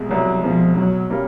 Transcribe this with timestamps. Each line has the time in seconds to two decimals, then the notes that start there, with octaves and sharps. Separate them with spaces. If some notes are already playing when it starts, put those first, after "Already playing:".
Already playing: C2 B2 G#3
0.11 C2 F#3
0.44 B2 F3 G#3
0.77 B2 F#3
1.10 G3 A#3 C#4